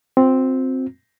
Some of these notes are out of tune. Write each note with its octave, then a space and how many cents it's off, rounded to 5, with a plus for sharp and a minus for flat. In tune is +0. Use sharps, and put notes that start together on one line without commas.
C4 +0 F4 +45